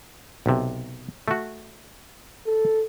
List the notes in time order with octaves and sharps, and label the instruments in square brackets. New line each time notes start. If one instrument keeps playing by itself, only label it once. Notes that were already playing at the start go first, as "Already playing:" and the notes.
[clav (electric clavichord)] B1 C3
A3 F#4
[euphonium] A4